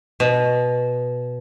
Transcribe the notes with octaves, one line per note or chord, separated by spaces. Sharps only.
B2